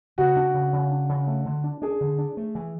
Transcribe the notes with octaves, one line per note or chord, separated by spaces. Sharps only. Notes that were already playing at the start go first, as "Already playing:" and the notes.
C#3 F#4
D4
C#3
C#3
D4
C#3
A3
D3
D4
D4 G#4
D3
D4
A3
E3